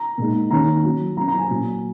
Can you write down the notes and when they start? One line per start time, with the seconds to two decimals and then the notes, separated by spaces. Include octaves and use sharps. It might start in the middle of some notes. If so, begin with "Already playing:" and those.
Already playing: A#5
0.18 A#2 G#3 D#4
0.50 D#3 A#3 C#4 A#5
0.84 F#3 C#4
1.17 F#3 C#4 A#5
1.28 A#5
1.39 G#5
1.50 A#2 F#3 C#4